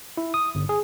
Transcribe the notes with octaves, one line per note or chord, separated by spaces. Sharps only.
E4
D#6
G1
G#4